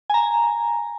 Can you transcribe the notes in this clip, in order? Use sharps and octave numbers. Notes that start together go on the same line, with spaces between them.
G#5 A#5